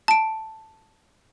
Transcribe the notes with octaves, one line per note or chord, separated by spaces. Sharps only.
A5 D7